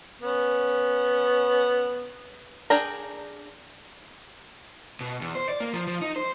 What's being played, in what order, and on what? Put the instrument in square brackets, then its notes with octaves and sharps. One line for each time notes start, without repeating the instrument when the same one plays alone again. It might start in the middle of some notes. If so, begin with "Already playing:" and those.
[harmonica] B3 C#4
[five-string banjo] D4 G#4 A#4 G5 A#5
[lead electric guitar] B2
E2
C5
D5
A#3
F3
F3
D#4
C5